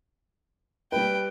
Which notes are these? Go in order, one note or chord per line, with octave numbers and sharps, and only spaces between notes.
G3 B4 G5